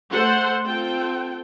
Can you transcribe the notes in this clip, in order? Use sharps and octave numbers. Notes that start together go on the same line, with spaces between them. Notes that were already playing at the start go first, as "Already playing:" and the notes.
A3 A4 C5 F#5
C4 F4 A4 G5